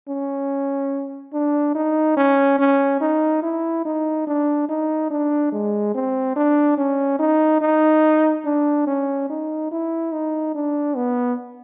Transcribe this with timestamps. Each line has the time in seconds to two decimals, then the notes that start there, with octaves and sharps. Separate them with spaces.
0.08 C#4
1.33 D4
1.75 D#4
2.17 C#4
2.59 C#4
3.01 D#4
3.43 E4
3.85 D#4
4.27 D4
4.69 D#4
5.11 D4
5.52 G#3
5.95 C4
6.36 D4
6.78 C#4
7.19 D#4
7.61 D#4
8.45 D4
8.87 C#4
9.30 D#4
9.71 E4
10.12 D#4
10.55 D4
10.96 B3